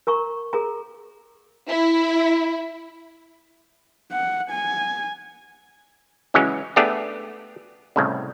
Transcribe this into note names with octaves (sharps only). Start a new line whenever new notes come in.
A#4 A#5 C#6
G#4 A#4 A#5
E4
F#5
G#5
C#3 E3 F#3 G#3 C#4
A3 B3 D4 G4 G#4
C2 A2 C#3